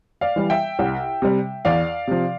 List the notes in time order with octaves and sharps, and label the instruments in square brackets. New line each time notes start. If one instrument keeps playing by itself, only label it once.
[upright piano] D5 F5
E3 G3
E5 G5
C2
C3 G3
E2 D5 F5
C3 F3